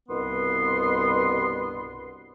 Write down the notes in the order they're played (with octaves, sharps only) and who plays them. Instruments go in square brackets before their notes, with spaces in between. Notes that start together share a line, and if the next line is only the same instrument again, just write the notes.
[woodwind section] C2 G2 B2 B3 C6